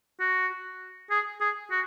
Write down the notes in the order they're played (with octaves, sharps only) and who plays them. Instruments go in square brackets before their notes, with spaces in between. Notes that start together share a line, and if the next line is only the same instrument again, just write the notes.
[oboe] F#4
G#4
G#4
F#4